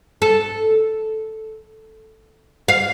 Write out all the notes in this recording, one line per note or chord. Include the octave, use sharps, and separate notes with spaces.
A4
F5